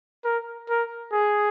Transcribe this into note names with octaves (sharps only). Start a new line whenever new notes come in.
A#4
A#4
G#4